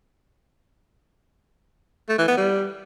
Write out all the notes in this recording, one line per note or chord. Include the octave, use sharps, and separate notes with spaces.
A3
E3
B3
G3